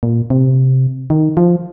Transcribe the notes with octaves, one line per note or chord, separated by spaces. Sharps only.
A#2
C3
D#3
F3